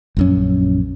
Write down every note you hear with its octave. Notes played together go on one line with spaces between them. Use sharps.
A#1 F#2 C#4